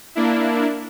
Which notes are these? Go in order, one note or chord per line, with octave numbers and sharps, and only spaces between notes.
A#3 D4 E4